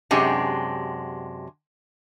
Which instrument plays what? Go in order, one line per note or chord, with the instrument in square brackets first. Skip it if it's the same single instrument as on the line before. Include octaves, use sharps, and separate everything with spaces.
[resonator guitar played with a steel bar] F#2 C3 G#3 D4 G4